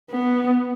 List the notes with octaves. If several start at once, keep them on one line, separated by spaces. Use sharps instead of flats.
B3